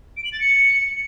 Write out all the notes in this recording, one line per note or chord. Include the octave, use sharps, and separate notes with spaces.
D7
F#7
A6
C#7